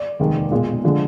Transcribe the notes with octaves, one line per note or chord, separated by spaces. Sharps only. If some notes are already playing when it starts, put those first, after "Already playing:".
Already playing: D5
F1 D#2 D#3 G#3
B1 A#2 G#3
D3 F3 G#3